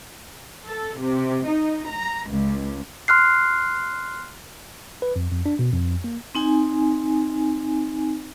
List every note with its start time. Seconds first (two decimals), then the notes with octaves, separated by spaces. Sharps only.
0.66 A4
0.99 C3
1.45 D#4
1.88 A#5
2.27 C#2
3.08 C6 F6 F#6 C7
5.02 B4
5.16 F2
5.31 F2
5.46 D4
5.59 B2
5.73 F2
6.04 A#3
6.35 C4 D#4 G#5